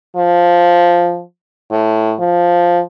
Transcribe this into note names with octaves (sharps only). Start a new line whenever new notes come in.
F3
A2
F3